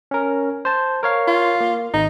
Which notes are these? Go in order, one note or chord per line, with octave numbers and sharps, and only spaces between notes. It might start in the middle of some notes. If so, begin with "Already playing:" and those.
C#4 A#4
C5 A5
A#4 C#5 F5
F4
A#3
G#1 D#4